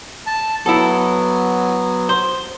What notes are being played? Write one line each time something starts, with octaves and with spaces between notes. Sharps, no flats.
A5
F#3 B3 E4 A4
C5